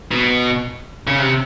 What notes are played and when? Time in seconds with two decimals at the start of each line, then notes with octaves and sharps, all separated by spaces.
0.11 B2
1.07 C#3
1.19 C3